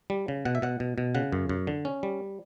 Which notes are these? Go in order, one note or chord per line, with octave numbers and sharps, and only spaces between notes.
G3
C#3
B2 F#5
E5
B2 F#5
B2
B2
C#3 F#5
F#2
F#2
D3
C#4
G3